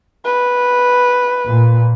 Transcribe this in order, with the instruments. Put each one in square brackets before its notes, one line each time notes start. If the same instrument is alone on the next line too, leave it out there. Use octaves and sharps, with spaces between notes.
[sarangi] B4
[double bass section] A#2